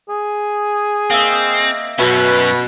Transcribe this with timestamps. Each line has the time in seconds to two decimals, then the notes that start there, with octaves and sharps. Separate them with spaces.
0.09 G#4
1.10 A#3 C4 D#5 E5
1.98 F#2 B2 C#4 E5 F#6